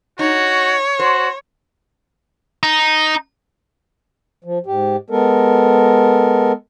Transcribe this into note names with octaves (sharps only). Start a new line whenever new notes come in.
D#4 F#4 C#5
F#4 C5
D#4
F3
G#2 G4
G#3 B3 A4 A#4